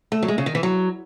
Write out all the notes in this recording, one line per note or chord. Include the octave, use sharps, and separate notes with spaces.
A3
F#3
G#3
C#3
D#3
E3
F#3